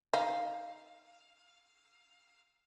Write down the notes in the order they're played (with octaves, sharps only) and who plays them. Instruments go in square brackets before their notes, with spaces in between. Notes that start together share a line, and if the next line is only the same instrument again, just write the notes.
[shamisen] D#4 [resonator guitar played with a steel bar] F5